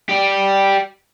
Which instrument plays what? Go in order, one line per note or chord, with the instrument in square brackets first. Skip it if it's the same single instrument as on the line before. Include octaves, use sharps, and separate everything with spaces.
[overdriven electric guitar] G4 D5